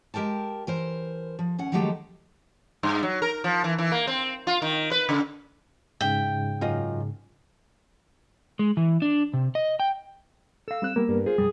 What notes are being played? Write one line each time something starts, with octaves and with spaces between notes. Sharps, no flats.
G#3 G4 A#4 G5 A5
E3 A#4 C5
F3
D#2 C#4 F#5
D#3 F3 F#3 G#3 A3 G4
G2
F#3
A#4
F3
E3
E3
A#3
C4
F4
D#3
B4
C#3
G#2 C#3 E5 G5
F#2 F4 D#5
G#3
E3
D4
C3
D#5
G5
A4 F5 E6
G3 C4 F#6
G3 A#3 B3 A#4
G2
F4 G#4 C5
B1 F#2 G3 D#6